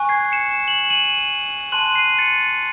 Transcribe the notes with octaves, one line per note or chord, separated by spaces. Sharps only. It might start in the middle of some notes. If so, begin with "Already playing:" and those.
Already playing: G#5 C#6 F#6
G#6 C7
C#7 E7
F#7
E7
D#7 F#7
A5 C6 F#6 D#7 F#7
C7 D#7
A6 C#7